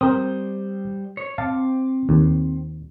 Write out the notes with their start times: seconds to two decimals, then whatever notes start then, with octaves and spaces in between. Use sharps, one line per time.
0.01 G3 C4 A#4 C5 D#6
1.17 C#5
1.38 C4 F5 A5 D6
2.09 D#2